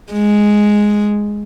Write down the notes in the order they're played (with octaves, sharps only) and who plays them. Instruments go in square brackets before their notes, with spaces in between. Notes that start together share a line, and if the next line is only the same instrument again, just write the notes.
[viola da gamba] G#3